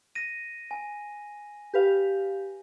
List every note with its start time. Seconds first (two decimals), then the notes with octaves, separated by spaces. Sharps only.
0.15 A#6 D#7
0.71 G#5
1.74 G4 B4 F5